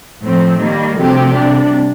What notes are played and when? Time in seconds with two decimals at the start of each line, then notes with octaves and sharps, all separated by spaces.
0.21 A2 F3 C4
0.59 D#3 G3 A#3
0.96 D2 C3 F3 C4 G4
1.34 C3 G3 D4